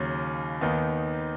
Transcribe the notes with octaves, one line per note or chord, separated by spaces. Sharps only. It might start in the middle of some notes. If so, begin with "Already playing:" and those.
Already playing: D#2 C#3 F#3 C#4
D#2 D#3 B3 D#4